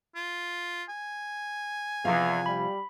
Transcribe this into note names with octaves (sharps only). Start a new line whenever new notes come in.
F4
G#5
E2 C3 F3 F5
G3 B5